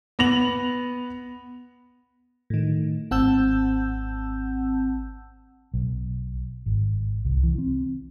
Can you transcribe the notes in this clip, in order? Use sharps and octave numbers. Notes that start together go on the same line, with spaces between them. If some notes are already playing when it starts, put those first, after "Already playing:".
B3 A#6 F7 F#7
A2 D#3
G#1 C4 F#5 A5 E6 G6
B1
G#1
C2
E3
C4